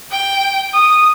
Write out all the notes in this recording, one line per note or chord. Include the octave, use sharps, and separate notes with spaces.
G5
D#6